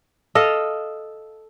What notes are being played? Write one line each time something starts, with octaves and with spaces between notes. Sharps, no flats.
A4 D#5 F5